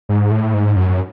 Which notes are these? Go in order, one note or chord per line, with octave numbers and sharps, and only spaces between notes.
G#2
A2
G#2
F#2